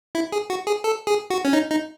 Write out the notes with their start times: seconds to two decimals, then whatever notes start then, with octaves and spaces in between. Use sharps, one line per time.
0.15 E4
0.32 G#4
0.50 F#4
0.67 G#4
0.84 A4
1.07 G#4
1.30 F#4
1.45 C#4
1.53 D#4
1.71 D#4